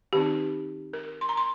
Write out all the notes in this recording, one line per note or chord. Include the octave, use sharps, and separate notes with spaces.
D#3 C4 D#4 G4
A#4
C6
A#5
C6